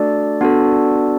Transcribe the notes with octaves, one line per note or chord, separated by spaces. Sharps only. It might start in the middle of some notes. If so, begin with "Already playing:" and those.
Already playing: A3 D4 F#4 A4 D5
B3 D4 F#4 A4